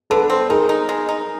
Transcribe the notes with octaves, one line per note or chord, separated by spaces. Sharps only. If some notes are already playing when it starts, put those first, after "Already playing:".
D3 A4 B4
C4
D#4 G#4 A#4
D#4
G#3
D#4